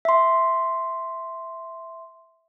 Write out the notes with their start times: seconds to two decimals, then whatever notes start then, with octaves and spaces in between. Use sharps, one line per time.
0.05 E5 C6